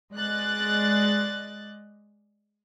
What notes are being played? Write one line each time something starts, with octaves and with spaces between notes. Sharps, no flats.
G#3 D5 D#5 F#6 A6